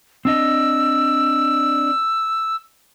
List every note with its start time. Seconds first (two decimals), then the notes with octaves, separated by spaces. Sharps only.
0.25 C4 D4 D#5 E6